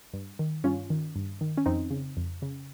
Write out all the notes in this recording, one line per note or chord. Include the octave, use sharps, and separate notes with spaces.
G2
D#3
G2 C#4 F4
D#3
G2
D#3
C#4
F2 C4 D#4
C#3
F2
C#3